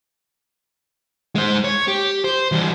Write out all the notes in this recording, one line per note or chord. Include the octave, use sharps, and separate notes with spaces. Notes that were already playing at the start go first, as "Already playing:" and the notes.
G#3 C5
C#5
G4
C5
E3 G3